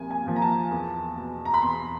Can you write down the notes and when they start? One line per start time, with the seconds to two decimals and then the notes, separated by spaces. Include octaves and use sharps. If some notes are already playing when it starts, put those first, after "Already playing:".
Already playing: C2 A#2 F3 G#5
0.11 G#5
0.26 A#2 F3
0.36 A#5
0.42 A5
0.71 E2
1.16 B2
1.45 A#5
1.54 B5
1.62 E2 C6